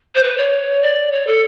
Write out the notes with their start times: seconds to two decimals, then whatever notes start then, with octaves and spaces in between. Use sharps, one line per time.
0.15 C5
0.23 B4
0.38 C#5
0.82 D5
1.12 C#5
1.27 A4